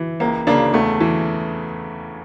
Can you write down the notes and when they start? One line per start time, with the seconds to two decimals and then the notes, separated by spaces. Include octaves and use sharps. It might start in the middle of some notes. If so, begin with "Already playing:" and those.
Already playing: E3
0.20 C#2 A#3
0.47 C#3 A#3 D4
0.74 E2 A3
1.00 E3